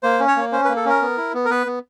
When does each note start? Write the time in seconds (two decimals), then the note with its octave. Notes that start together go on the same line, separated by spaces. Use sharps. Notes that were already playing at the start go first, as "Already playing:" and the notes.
0.03 A#3 C5
0.20 C#4
0.28 C#5
0.36 A#3
0.52 C#4 C5
0.65 B4
0.69 A#3
0.76 A4
0.85 C#4 A#4
1.01 B3
1.17 E4
1.34 B3
1.45 A#4
1.50 B3 B4
1.67 B3